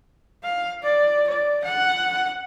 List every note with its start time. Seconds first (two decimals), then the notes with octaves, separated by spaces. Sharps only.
0.44 F5
0.83 D5
1.28 D5
1.65 F#5